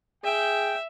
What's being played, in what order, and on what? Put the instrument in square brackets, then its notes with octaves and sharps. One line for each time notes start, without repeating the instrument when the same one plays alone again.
[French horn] G#4 [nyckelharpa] E5 [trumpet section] G5